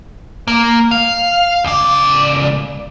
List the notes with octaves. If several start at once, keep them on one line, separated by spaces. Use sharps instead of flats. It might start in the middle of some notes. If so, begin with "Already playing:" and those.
A#3
F5
C#2 D5